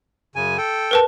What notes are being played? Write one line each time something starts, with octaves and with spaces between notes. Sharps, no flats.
F#2 C#3 G#5
A4 G5
A#4 B4 A5